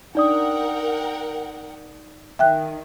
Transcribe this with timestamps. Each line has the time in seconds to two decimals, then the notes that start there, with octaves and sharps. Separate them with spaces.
0.15 D4 D#4 A#4 D5 F#5 G5 D#6
2.39 D#3 E5 G5 F#6